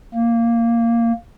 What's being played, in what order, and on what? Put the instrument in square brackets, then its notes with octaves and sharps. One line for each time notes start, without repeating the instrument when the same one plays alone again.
[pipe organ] A#3